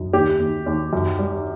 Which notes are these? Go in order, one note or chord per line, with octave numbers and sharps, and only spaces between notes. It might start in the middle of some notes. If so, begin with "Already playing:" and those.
Already playing: F#2
D#2 G4
D#2
D#2
F#2
G3